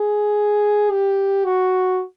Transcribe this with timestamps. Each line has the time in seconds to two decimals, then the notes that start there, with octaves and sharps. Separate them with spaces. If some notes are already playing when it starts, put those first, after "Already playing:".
Already playing: G#4
0.91 G4
1.45 F#4